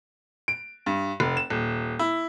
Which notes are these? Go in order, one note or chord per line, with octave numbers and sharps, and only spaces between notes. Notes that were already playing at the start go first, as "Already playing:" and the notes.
D7
G2
F1
E7
D#1
E4